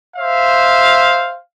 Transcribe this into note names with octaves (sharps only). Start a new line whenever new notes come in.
C5 E5 F5